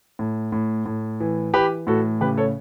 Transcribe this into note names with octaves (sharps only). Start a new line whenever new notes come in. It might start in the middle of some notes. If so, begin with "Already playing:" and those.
A2
A2
A2
E3
E3 G4 B4
A2 F#4 A4
C#3 G4 B4
A4 C#5